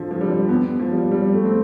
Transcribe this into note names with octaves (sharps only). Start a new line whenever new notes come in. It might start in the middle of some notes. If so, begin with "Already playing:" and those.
Already playing: D3 F3
F3
G3
B3
F3
G3
G3
A3
C4